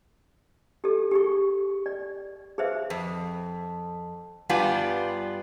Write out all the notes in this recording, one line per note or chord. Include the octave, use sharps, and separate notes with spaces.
G4 A4
G4 G#4 C#6
D5
G#4 B4 C5 E5 F5
F2
G2 G3 B3 F4 G#5